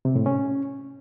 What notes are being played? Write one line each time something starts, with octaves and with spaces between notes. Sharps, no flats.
C3
A2
C#4